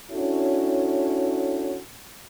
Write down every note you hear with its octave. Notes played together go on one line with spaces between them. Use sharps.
C#4 D4 E4 F#4 A4 C#5